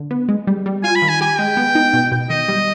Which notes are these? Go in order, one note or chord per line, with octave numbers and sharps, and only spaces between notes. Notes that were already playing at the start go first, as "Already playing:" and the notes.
Already playing: D3
B3
G#3
G3
G3
F4 G#5
B5
D#3
G#5
G4 G#5
G#3 G5
B3
D#4
B2
B2
D#3 D#5
G3